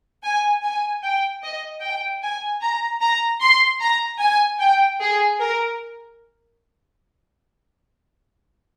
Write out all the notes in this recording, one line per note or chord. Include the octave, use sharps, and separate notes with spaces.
G#5
G#5
G5
D#5
G5
G#5
A#5
A#5
C6
A#5
G#5
G5
G#4
A#4